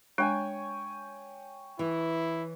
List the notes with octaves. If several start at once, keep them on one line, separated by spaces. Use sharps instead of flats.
G#3 D4 C#5 G5 G#5
E3 E4